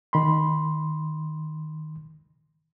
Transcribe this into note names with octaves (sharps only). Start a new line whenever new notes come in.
D#3 B5 C6